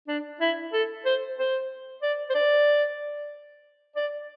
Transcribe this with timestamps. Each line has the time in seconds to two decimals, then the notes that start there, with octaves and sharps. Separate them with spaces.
0.08 D4
0.41 E4
0.73 A4
1.06 C5
1.38 C5
2.03 D5
2.30 C5
2.35 D5
3.96 D5